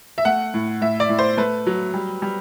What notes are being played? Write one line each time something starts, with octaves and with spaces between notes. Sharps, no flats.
E5
A3 F#5
A2
A2 E5
D5
A2
C5
A3 B4
F#3
G3
G3